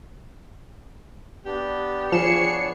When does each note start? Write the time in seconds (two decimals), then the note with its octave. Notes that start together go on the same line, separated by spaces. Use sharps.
1.46 B3 D4 G4
2.12 F3 G#4 C#5 C7 C#7 E7